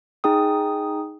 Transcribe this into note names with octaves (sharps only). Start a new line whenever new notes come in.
D#4 G#4 G5 D#6